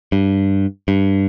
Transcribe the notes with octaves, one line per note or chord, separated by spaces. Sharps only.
G2
G2